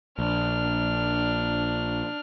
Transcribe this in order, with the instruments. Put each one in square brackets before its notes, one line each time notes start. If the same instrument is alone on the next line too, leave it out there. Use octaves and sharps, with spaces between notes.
[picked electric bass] A#1 [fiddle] D4 F6